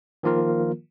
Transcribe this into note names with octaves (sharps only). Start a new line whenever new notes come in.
D#3 F3 A#3 F4 A#4